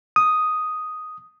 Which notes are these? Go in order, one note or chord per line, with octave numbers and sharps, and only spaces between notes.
D#6